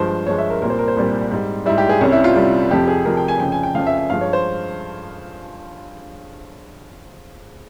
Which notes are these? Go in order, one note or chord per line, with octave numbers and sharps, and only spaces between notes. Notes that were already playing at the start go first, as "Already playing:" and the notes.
Already playing: G2 F3 G#3 C5
G2 F3 G#3 C#5
E5
A#4
C2 A#2 G3 A#4
C5
A#4
C5
C2 A#2 G3
G#2 G3
G#2 G3 E4
G4
G#4
C2 C3 G3 C#4
E4
F4
C2 C3 G3
F2 C3 F3 G4
G#4
F2 C3 F3 A#4
G5
G#5
F2 C#3 F3 G5
G#5
G5
F2 C#3 F3 F5
E5
E5
G2 F3 G#3 F5
C#5
C5